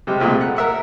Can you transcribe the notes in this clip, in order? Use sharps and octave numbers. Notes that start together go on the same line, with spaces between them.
C3 G3 G#3
C2 A#2 G#3 A3
F#5
A#4 E5 F#5